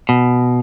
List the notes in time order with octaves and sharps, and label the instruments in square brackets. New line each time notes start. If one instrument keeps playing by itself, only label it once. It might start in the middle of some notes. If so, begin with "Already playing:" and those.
[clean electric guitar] B2